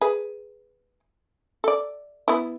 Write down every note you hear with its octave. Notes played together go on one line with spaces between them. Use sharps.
G#4 B4
A4 D5
B3 E4